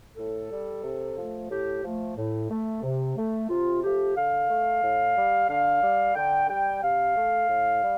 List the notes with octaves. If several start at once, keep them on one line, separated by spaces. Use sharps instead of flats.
A2 A4
G3
C3
F3 A3
A2 G4
F3 A3
A2
A3
C3
A3
C3 F4
F3 A3 G4
D3 F5
A3
A2
G3
D3 F5
G3
D3 G5
G3 G5
C3 F5
A3
A2
G3